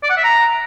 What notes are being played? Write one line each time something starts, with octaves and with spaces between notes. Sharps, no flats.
D5
F#5
E5
A#5